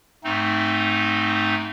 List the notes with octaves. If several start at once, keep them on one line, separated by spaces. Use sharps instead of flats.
G#2 A3 C4 D#4